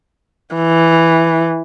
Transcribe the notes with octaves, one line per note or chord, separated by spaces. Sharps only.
E3